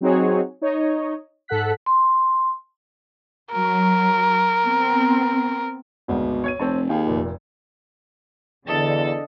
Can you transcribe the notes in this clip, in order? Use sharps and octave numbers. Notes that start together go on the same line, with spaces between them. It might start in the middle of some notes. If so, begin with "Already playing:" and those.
F#3 C4 D#4 F#4 G#4 C#5
D#4 C#5 D#5
G#2 A4 F#5 F#6 B6
C6
F#3 A#4
B3 C4
G#1 D2 G#2 B2
C#5 G#6 D#7
F1 C4 C#5 A5
D#2 G#4 F5 G5
F1 A#2
E2 D3 D4 A4 D#5 A6